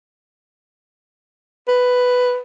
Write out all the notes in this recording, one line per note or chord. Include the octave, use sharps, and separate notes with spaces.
B4